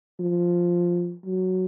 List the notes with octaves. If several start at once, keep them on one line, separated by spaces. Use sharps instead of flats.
F3
F#3